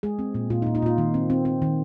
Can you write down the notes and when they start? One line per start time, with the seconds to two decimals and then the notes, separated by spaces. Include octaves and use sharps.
0.03 G#3 G#4
0.19 C4
0.34 A#2
0.50 A#2 F4
0.62 D#4
0.66 A#2
0.75 D#4
0.82 A#2 F4
0.98 D#3
1.14 C4
1.30 C4
1.45 C4
1.62 D#3